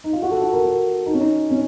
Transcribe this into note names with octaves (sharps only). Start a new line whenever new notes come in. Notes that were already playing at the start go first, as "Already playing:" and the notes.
D#4
F4
F#4
A4
F#4
A#4
A#4
D#4
C#4
D#4
C#4